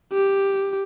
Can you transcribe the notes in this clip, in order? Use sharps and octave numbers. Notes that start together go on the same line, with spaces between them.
G4